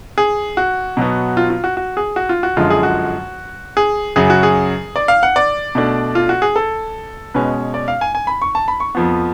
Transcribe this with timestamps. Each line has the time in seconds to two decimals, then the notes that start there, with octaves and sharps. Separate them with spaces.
0.18 G#4
0.57 F#4
0.97 B2 F#3 B3
1.37 F4
1.50 F4
1.64 F#4
1.77 F#4
1.97 G#4
2.16 F#4
2.29 F4
2.43 F#4
2.57 F#2 D3 F3 G#3 F4
2.70 G#4
2.83 F#4
3.77 G#4
4.16 F#2 C#3 F#3 G#4
4.30 F#4
4.43 G#4
4.96 D5
5.08 F5
5.23 F#5
5.36 D5
5.75 B2 A3 D4
6.15 F4
6.29 F#4
6.42 G#4
6.56 A4
7.34 B2 G#3 C#4 B4
7.74 D5
7.88 F5
8.01 G#5
8.15 G#5
8.27 B5
8.42 C#6
8.55 A5
8.68 B5
8.80 C#6
8.95 F2 F3 B3